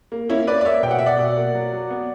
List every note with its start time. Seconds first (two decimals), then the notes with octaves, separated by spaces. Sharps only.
0.12 A#3
0.29 A#3 C#4 E4
0.47 A#3 B4 D5
0.61 D5
0.65 A#3 C#5 E5
0.83 B2 G5
0.91 F#5
0.98 B2 E5
1.06 D5 F#5
1.19 B2
1.37 A#3
1.55 F#3
1.73 F#3
1.90 B3